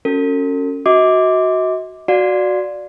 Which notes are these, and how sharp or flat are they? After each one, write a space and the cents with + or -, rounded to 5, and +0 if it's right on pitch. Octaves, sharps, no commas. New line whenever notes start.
C#4 +0 F#4 +0 A4 +40
F#4 +0 D#5 +40 D6 +0
F#4 -5 D5 +0 F5 +30